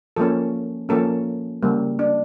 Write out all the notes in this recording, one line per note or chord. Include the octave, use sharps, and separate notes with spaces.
F3 A#3 C#4 A4
F3 A#3 C#4 A4
C#3 G3 A#3
D4